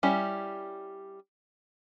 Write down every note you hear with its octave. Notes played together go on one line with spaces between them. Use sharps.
G3 C#4 E4 G4 C#5